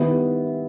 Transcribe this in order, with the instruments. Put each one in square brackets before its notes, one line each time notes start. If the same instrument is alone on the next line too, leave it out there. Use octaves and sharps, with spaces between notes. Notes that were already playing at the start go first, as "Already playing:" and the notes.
Already playing: [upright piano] D#3 G3 B3 E4